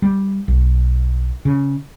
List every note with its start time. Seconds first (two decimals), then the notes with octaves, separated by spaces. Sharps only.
0.02 G3
0.48 B1
1.45 C#3